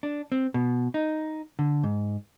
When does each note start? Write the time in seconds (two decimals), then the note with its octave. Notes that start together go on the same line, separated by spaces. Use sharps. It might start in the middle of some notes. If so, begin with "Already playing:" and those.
0.03 D4
0.32 C4
0.54 B2
0.94 D#4
1.59 D3
1.83 G#2